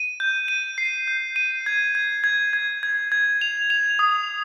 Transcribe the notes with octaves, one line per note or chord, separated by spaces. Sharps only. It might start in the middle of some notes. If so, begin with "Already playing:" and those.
Already playing: D#7
G6
D#7
C7
G6
D#7
G#6
G#6
G#6
G#6
G#6
G#6
F7
F7
D#6